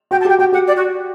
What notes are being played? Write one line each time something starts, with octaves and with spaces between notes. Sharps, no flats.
F#4 G5
A5
G4 G5
F#4 G5
G4 F#5
D5
F#4